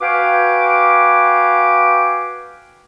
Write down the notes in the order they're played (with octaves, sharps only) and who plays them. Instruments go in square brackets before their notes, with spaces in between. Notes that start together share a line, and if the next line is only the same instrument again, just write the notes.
[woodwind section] F#4 B4 F5 G5 G#5 D6